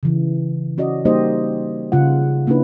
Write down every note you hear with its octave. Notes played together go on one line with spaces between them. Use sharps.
C#3 E3
C#4 F#4 D5 D#5
G3 A#3 D#4 G4 C5 D#5
C#3 F4 F#5
A#3 C#4 D4 E4 B4